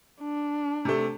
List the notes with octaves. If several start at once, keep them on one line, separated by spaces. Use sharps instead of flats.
D4
C3 A3